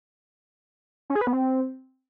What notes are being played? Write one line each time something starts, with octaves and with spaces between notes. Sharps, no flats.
C#4
G#4
B4
B3
C4